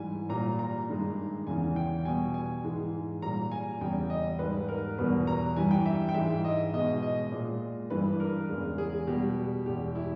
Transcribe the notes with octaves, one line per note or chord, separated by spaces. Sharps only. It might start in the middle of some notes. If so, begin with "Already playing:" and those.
Already playing: G#2 E3 G3 G#5
A#2 G3 A#5
A#5
G2 D#3 G#3
E2 C#3 E3 G#5
G5
B2 G3 G#5
G#5
G#2 E3 G#3
A#2 G3 A#5
G#5
E2 C#3 G3 G5
D#5
G#2 G3 B4
A#4
E2 B2 G3 B4
A#5
G2 E3 G3 G#5
G5
E5
G5
G#2 E3 G#3 E5
D#5
B2 G#3 D#5
D#5
A#2 G#3
G2 E3 G3 B4
A#4
E2 C#3 G#3
G#4
B2 G3 G4
E2 B2 G#3 G4
E4